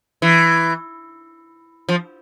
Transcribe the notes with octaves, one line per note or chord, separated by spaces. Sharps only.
E3
F3